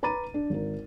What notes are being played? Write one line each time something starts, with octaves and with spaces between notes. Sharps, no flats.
B4 A#5 B5 D6 A6 D#7
D4
G#1 A#4